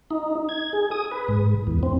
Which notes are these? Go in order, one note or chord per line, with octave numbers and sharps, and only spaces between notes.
D#4
G#6
G#4
D#6
B4
G#2
E2
C4